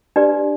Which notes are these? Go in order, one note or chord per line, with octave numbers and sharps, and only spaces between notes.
D4 G4 B4 D5